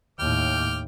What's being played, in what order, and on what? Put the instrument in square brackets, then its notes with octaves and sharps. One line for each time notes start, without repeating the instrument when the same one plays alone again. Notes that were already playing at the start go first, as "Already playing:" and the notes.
[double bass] D#2 A2 [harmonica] G5 D6 F6